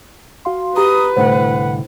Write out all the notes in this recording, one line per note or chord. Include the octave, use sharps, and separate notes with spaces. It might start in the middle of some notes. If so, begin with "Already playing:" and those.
F#4 F5 C6
G4 B4 A#5 D#6
C2 A2 D3 C5 F#5